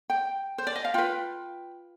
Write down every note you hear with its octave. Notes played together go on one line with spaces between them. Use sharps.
G5
C5
D5
D#5
F5
F4 B4 G5